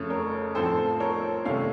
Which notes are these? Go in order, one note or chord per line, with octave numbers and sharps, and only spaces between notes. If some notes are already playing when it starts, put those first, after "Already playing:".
Already playing: F2 C#3 A3 C#4 C#5
A#4 C#5
A2 F3 C4 A4 C5
A#4 C#5
C3 D#3 A3 C#4 C#5 F5